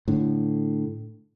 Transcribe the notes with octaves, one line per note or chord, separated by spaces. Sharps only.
A2 D3